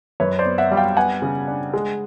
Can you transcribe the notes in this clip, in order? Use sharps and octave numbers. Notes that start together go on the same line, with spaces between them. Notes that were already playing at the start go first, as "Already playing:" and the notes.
F#2 B4 C#5
C5 D5
B3
E5 F#5
G3
F5 G5
B3 F#5 G#5
C#3
D4
G#3